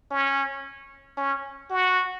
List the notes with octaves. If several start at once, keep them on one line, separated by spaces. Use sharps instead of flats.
C#4
C#4
F#4